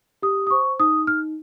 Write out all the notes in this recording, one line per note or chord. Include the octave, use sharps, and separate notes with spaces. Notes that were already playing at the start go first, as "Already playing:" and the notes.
G4 D#6
D#6
C5 C#6
D#4 D#6
D#4 F6